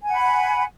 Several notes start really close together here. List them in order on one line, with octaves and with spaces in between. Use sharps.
G#5 F#5 B5